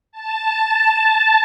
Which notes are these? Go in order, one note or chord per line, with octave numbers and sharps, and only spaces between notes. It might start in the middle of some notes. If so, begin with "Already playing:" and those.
A5